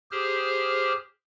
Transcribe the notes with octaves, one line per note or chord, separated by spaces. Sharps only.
G4 G#4 C5 F6